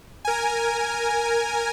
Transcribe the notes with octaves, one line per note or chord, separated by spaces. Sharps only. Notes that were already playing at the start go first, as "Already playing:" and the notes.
A#4 G#5